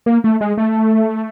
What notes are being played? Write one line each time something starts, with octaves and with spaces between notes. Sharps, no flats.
A#3
A3
G#3
A3